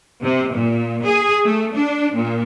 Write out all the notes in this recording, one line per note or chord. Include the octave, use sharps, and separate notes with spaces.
C3
A#2
G#4
A3
D4
A#2